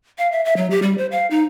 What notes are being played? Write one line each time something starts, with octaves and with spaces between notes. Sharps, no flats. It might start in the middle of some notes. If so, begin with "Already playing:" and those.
F5
E5
E5
F#3
G4
G3
C5
F5
D#4